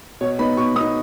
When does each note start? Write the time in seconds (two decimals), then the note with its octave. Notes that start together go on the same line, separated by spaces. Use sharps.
0.21 B2 C#5
0.39 B3 D#4 B5
0.57 B2 C#6
0.75 B3 D#6
0.79 D#4